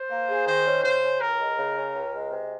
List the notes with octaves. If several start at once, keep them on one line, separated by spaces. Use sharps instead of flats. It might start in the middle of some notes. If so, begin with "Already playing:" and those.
Already playing: C5
A#3
G#4
D#3 C5
C#4
C#3 C5
C#4
C#2 A#4
G#3
C#3
C#4
C#2
G#3
C3